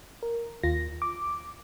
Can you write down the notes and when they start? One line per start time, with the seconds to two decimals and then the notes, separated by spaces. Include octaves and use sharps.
0.23 A#4
0.63 D#2 F4 A#6
1.02 D6